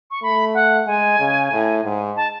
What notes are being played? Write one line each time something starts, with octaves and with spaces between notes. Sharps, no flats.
C#6
A3 B5
F#5
G#3 G#5
C#3
A2
G#2
A5